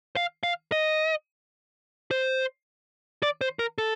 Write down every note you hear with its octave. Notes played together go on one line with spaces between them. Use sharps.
F5
F5
D#5
C5
D5
C5
A#4
A4